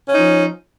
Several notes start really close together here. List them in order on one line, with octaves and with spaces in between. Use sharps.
C#4 D#4 F3